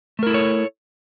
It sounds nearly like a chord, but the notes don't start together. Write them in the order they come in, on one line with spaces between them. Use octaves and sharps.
A3 A#4 E4 A4 C#5